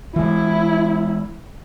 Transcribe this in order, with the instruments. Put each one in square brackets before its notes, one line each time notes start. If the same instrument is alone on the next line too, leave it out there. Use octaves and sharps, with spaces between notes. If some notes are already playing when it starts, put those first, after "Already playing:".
[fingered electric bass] E3 G#3 [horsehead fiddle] E4